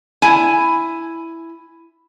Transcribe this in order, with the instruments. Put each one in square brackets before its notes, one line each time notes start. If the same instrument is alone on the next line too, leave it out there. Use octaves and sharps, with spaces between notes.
[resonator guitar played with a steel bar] E4 G#5